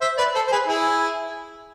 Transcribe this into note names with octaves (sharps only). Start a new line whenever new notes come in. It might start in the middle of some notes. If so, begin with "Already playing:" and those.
C5 E5
B4 D5
A4 C5
C5
G#4 B4
E4 G#4